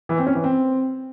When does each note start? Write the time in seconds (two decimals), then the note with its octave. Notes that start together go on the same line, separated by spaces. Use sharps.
0.09 E3
0.18 C4
0.26 C#4
0.35 E3
0.44 C4